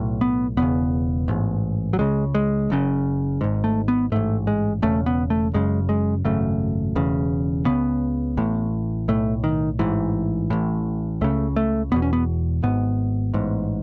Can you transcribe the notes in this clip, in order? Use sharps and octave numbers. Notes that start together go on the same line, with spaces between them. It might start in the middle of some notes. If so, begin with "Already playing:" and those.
Already playing: B1 A2
B3
E1 E2 C#3 B3
A1 G#2
F#3
C#2 C#3 G#3
G#3
F#1 F#2 C#3
G#1 G#2
A3
B3
A1 G#2 A3
G#3
E1 E2 C#3 A3
B3
A3
F#1 F#2 C#3 G#3
G#3
G#1 F#2 C#3 A3
E1 E2 C#3
C#2 C#3 B3
A1 A2
B1 A2 A3
D#3
A1 G#2 E3
A1 A2
C#2 C#3 A3
A3
E1 E2 B2 B3
C#4
B3
G#1 G#2 B3
A1 G#2